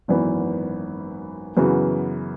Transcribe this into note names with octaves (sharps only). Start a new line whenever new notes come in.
G#1 F#2 E3 B3
F#2 C#3 E3 B3 F#4